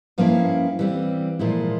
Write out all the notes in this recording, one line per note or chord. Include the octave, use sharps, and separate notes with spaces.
G2 F3 A#3 C#4 E4 F5
E3 G3 C4
A#2 F3 G#3 E4